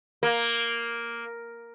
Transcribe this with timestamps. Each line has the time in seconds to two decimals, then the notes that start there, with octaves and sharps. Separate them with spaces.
0.23 A#3